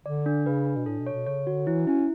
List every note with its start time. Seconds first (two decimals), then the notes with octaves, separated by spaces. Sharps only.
0.06 D3 D5
0.26 D4
0.46 C#3 B4
0.66 D4
0.76 B2
0.86 A2 A4
0.99 B2
1.06 C#5
1.13 B2
1.27 C#3 C#5
1.47 D3 F#4
1.67 E3 E4
1.87 C#4 E4